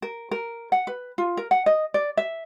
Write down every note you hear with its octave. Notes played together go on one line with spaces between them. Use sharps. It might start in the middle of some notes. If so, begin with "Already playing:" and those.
A#4
A#4
F#5
B4
F4
A#4
F#5
D#5
D5
E5